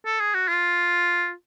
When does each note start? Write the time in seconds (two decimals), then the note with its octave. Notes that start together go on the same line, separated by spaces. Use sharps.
0.06 A4
0.20 G#4
0.34 F#4
0.48 F4